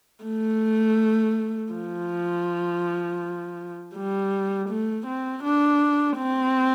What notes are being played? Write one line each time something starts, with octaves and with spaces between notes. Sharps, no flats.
A3
F3
G3
A3
C4
D4
C4